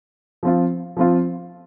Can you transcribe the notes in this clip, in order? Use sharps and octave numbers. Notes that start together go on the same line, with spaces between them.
F3 C4 F4
F3 C4 F4